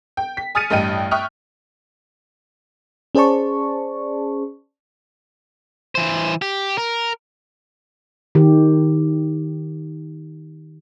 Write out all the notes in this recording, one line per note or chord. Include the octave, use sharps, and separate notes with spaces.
G5
B6
G#5 D#6 F6 A6 C#7 D#7
A1 G2 D#5 G5 D#7
E5 G5 C#6 D#6 F6 F#6
C#4 G#4 C5 D5 A5 C#6
E3 C5
G4
A#4
D#3 G4